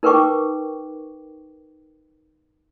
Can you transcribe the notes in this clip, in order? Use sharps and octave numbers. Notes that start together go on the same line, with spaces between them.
D#4 A#4 B4 G5 C#6 D6